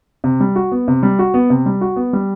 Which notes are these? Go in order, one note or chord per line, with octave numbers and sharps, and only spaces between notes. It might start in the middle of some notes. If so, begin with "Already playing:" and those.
C3
G3
F#4
B3
C3
G3
F#4
B3
C3
G3
F#4
B3
G3